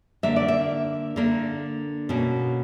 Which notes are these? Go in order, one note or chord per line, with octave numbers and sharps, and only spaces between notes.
D3 A#3 D4 E5
D5
E5
D3 A#3 D4
B2 A#3 C#4